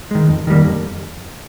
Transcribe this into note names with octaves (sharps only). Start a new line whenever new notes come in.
D#3 G#3
F2
D#3 G3 A#3
F2